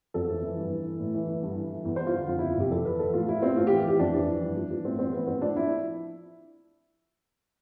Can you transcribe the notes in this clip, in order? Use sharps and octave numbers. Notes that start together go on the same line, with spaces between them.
F2 A4
E3
E3
G2
E3
E3
A2
E3
E3
G2
E3
E3
E2
E2 C5
F4
D3
F2 F4
F2 E4
F4
C3 G4
F2 A4
E3 B4
E3 A4
A2 F4
F3 E4
F3 C4
A2 F4
E3 G4
E3 G4
F2 D4
E3
E3
G2
F3
F3
A2 C4
E3 C4
E3 B3
A2 C4
F3 D4
F3 E4